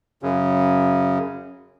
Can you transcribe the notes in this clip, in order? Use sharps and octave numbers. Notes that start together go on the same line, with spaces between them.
F#2 C#3